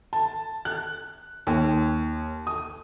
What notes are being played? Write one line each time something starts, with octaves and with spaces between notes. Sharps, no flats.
A5
F#6
D#2
D#6